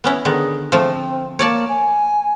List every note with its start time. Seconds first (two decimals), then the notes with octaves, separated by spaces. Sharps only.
0.04 B3 C#4 E4
0.25 D3 D#3 B3 G#4
0.72 F3 A3 C4
1.39 A#3 C#5 D5 A5
1.69 G#5